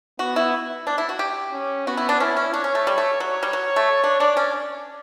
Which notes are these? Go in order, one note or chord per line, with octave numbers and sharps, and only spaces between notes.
B3 F#4
E4
D4
E4
F#4
G4
C#4
B3 F#4
E4
D4
C#4 E4
C#4
D4 C#5
C#4
A3
G3
A3
F#3 C#5
G3
F#3
A3
D4
D4 D5
C#4